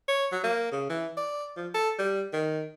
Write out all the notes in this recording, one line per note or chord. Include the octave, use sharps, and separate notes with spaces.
C#5
F#3
A#3
C#3
E3
D5
F3
A4
G3
D#3